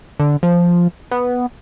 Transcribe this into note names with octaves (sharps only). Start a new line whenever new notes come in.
D3
F3
B3